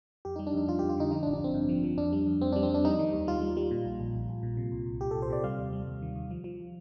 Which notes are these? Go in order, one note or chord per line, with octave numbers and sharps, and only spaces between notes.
F2 G4
G3 D#4
D4
F2 D#4
F2 F4
F2 G4
F4
D3 D#4
F3 D#4
D4
A1
D4
A1 C4
G2
F3
F3
F2 D4
G3
F2
F2 C4
G3 D4
C4
F2 D4
G3 D#4
D#3
D#2
G3 F4
G3
G3
A#2
A#1
A#1
A#1
A#1
A#2
C3
C2
C2
C2 G4
C2 A4
C5
C3 D5
G3 F5
D#2
G3
D#2
D#3
D#2
F3
F3